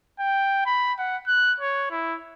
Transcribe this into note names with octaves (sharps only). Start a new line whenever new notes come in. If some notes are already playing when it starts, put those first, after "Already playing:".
G5
B5
F#5
F#6
C#5
E4